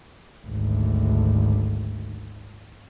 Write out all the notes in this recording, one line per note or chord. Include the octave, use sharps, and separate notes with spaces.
G#1 D2